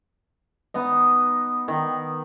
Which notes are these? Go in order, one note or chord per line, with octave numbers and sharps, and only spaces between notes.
B3 D#4 D#5
D#3